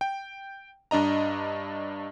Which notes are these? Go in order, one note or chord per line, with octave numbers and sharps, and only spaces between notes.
G5
G2 D4 D#5 A#5